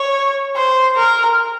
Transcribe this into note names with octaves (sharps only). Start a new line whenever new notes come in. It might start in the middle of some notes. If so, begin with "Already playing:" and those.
Already playing: C#5
C5
A#4